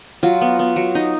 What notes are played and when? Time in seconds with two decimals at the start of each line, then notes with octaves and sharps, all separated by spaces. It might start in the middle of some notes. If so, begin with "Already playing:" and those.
0.23 F#3 F4
0.41 B3
0.59 B3
0.76 F#3
0.95 D#4